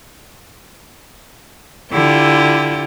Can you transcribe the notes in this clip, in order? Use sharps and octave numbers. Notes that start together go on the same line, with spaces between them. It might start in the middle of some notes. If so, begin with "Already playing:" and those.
D3 E4 F4 G4